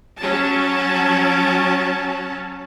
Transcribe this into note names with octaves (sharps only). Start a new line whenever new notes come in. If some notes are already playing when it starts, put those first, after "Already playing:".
F#3 C#4 A5